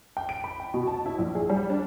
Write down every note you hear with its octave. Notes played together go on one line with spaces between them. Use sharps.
G5
D7
B5
G5
B2
A5
E4
A#1
G#4
G3
D4